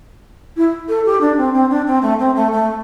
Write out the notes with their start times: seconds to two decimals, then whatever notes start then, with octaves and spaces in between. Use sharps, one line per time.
0.56 E4
0.88 A4
1.05 G4
1.20 D4
1.37 C4
1.53 C4
1.70 D4
1.86 C4
2.02 A3
2.19 C4
2.36 A3
2.52 A3